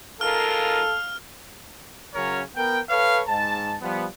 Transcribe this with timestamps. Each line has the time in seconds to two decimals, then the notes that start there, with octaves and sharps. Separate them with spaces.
0.21 G#2 F4 A4 A#4 F5 F6
2.15 C#3 F#3 C#4 A#4 C#5
2.56 B3 A#4 G5
2.89 A4 B4 C#5 F5
3.27 G#2 A5
3.81 F3 G3 B3